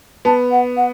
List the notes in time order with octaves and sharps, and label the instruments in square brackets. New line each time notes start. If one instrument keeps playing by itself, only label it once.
[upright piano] B3 [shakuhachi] A5
[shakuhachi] F#5
F#5